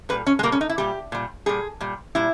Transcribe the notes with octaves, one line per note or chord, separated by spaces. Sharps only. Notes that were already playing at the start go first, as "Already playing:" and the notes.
A#2 G3 B4
C#4
G#3
A#2 G3 A#3
C#4
D#4
E4
A#2 G3 G4
A#2 G3
A#2 G3 G#4
A#2 G3
A#2 G3 E4